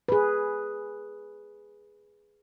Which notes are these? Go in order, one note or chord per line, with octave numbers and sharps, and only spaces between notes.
G#4 B4